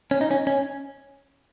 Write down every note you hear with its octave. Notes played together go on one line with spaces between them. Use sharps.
C#4
D#4
C#4
C#4